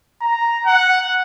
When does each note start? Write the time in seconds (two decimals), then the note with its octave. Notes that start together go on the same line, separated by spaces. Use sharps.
0.21 A#5
0.66 F#5